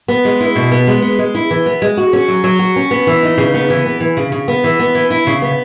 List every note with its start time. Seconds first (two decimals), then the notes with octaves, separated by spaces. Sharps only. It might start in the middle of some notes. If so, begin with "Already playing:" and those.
0.08 B3
0.25 G#3
0.41 E4
0.56 B2
0.71 B3
0.87 G#3
1.02 B3
1.19 G#3
1.35 E4
1.51 E3
1.66 B3
1.82 G#3
1.97 F#4
2.13 C#4
2.28 F#3
2.44 F#3
2.59 F#4
2.76 C#4
2.91 B3
3.07 E3
3.23 D#4
3.38 C#3
3.54 B3
3.70 E3
3.85 B3
4.00 E3
4.17 C#3
4.32 C#3
4.48 B3
4.64 E3
4.79 B3
4.95 E3
5.11 E4
5.27 C#3
5.42 B3